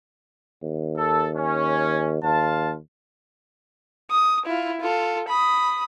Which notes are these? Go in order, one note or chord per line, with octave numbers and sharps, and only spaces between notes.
D#2
A4
C#4
D#2 F4 F5 A5
D#6
E4 F4
F4 A4
B5 D#6